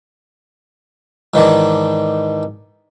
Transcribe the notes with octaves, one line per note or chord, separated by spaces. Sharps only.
G#2 D#3 E3 D4